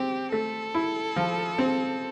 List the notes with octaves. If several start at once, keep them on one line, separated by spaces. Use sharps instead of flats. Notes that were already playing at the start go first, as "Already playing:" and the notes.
Already playing: C4 G4
A3 A4
E4
F3
C4